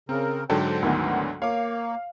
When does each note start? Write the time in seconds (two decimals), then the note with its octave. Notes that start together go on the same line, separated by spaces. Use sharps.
0.09 C#3 C4 A#4
0.50 G#2 D3 F#3 A4 C5 G5
0.82 D2 D#3 E3 B3
1.42 A#3 C#5 F5 D6